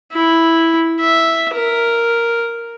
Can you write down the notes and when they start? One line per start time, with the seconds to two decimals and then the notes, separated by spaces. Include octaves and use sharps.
0.13 E4
1.00 E5
1.55 A#4